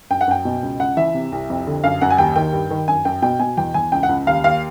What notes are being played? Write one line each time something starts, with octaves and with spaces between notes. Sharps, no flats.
F#2 G5
F#5
F#2 G5
B2
C#2
C#2 F#5
E3 E5
C3
C2
F2
D3
F#2 F5
F#2 F#5
G#5
D#2 G5
D#3 G5
G2
D#3
F#2 G#5
F#2 G5
B2 G5
B2 G#5
E2 G5
E2 G#5
C#2 G5
F#5
C#2
D#2 F5
D#2 F5